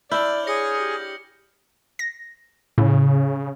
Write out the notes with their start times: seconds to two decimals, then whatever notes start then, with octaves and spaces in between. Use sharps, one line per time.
0.11 D4 E4 D5 F6 G6 F#7
0.47 G#4 C#5 A#6 C#7
0.81 G4
1.99 A#6
2.78 A2 C#3